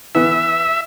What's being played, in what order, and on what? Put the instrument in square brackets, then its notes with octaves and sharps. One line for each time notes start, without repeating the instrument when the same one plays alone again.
[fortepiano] E3 B3 [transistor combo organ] E5